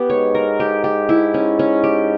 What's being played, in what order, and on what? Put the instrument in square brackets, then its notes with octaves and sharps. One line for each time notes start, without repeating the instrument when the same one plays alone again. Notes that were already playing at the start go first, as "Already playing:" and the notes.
Already playing: [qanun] B3 G4
[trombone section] G#2 [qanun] C#5
[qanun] A#4
G4
G4
E4
C#4
C#4
G4